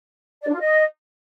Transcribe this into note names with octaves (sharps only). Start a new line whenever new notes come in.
D5
D4
F4
D#5